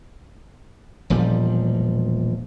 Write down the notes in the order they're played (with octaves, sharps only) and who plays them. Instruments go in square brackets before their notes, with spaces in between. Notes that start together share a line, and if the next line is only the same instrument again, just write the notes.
[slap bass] E1 A#2 F3 G3